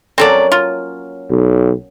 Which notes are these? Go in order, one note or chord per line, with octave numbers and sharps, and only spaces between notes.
F#3 A#3 C4 C#4 A4 D5
F4
B1